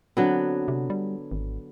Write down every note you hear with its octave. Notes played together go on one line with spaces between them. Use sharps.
D3 F#3 B3 C4
C3
G3
G#1